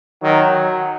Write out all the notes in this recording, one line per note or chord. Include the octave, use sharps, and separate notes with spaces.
D#3 F#3